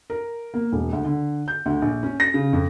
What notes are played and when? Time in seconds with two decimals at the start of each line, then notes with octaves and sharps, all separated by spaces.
0.10 A#4
0.54 A#3
0.72 E1
0.93 D2
1.05 D3
1.48 G6
1.66 D2
1.82 A#1
2.03 C#4
2.20 A#6
2.34 C#3
2.53 F2